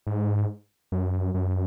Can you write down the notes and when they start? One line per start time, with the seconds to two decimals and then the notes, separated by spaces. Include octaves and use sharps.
0.07 G#2
0.92 F#2
1.34 F#2